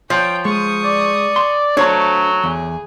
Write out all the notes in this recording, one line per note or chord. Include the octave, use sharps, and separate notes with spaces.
F3 C#5 G5
G#3 C#6 D#6
D5
C6
F#3 A3 D4 C5 C#5 A#5
E2 G#4